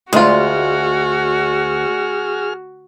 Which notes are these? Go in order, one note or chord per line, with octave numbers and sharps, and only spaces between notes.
D2 G#3 F4 F#4 G#4 F6